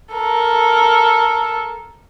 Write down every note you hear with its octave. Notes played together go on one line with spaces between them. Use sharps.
A4 A#4